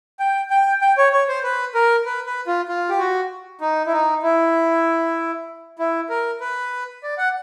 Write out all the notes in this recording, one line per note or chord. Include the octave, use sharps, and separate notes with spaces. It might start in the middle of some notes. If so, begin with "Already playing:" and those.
G5
G5
G5
C#5
C#5
C5
B4
A#4
B4
B4
F4
F4
G4
F#4
D#4
E4
D#4
E4
E4
A#4
B4
D5
F#5